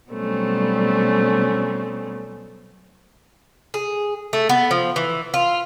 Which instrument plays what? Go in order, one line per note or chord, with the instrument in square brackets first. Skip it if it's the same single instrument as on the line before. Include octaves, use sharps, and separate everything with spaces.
[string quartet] B2 F#3 G3 A3 C4 C#4
[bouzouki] G#4
A3
B3
F3
E3
F4